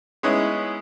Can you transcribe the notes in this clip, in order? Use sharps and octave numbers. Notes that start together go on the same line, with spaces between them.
G#3 B3 C#4 D#4 E4